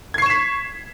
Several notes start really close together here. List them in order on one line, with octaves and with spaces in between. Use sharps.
G#6 C7 C#6 E7 B6